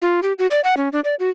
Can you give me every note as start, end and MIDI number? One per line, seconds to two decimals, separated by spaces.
0.02 0.20 65
0.23 0.33 67
0.39 0.47 66
0.51 0.60 74
0.64 0.75 78
0.77 0.89 61
0.92 1.00 62
1.04 1.15 74
1.19 1.30 66